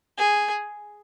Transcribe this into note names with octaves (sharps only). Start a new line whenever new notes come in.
G#4